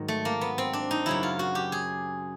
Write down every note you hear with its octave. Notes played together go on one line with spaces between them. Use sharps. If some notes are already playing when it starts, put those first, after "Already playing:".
Already playing: G#2 D#3 F#3
A3
A#3
B3
C4
D4
D#4
F#2 C#3 F#3 E4
F4
F#4
G4
G#4